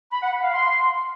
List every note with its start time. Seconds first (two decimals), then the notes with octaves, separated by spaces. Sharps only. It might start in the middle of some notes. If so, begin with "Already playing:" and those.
0.12 B5
0.22 F#5
0.33 B5
0.43 F5
0.53 C6